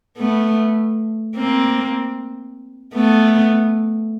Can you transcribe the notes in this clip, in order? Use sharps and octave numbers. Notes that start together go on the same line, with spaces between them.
A3 B3
A#3 C4
A3 B3